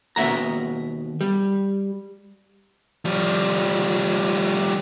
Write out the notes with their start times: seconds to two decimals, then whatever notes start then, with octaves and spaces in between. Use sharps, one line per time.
0.16 D#2 B2 E4 E5 F#5 A#5
1.21 G3
3.05 F3 G3